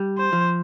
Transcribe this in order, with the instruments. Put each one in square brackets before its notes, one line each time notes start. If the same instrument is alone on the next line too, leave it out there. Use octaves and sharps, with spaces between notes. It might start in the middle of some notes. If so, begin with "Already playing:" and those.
Already playing: [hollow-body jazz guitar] G3
[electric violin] C5
[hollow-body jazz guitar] F3